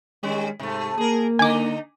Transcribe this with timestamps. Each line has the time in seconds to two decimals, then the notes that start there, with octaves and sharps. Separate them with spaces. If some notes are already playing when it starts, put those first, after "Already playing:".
0.23 D#3 G3 G#3 C#4
0.59 G#2 C3 A3
0.98 A#3 G#4 A#4
1.39 D3 D#4 G#5 D6